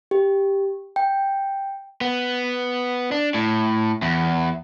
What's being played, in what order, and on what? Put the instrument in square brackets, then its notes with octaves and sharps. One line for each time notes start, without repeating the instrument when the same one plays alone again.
[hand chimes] G4
G5
[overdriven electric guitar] B3
D4
A2
E2